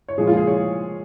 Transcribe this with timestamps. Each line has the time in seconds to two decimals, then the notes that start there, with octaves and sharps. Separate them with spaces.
0.08 C#5
0.18 A#2 F3 G#3 G#4
0.27 F4
0.37 G#4
0.47 C#5